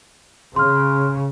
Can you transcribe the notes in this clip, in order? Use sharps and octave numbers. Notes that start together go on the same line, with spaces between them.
C#3 C6 F6